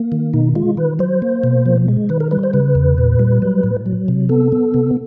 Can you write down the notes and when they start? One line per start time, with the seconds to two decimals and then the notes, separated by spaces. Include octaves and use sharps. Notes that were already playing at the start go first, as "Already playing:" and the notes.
Already playing: A#3
0.12 D#3
0.34 B2 D#4
0.55 G#3 F4
0.77 D#3 B4
0.99 F#3 C5
1.22 A#3
1.44 B2
1.66 F3
1.88 G#3
2.09 D#3 B4
2.20 A#4
2.31 G3 B4
2.43 C5
2.53 C#3 B4
2.75 E2
2.98 A#2
3.19 G3
3.42 F#3
3.64 A2
3.86 F#3
4.08 C3
4.29 B3 A4
4.52 B3
4.74 C3